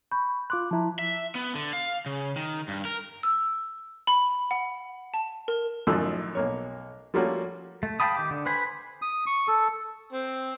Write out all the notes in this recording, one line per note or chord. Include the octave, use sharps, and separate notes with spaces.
B5 C#6 G6
F4 C6 D6 F#6
F3 E4 A5 A#5
E5
B3
D3
F5
C#3
D#3
G2
A#4
E6
B5
F#5
A5
A#4
A1 F#2 D#3 F3 A4 E6
B1 A#3 C#5
F3 G3 A3 A#3 C#4 F#4
A3
F5 G5 A5 B5 D#6
D#3 G4
D3
B4 C5 G#5 B5
D#6
C#6
A4
C4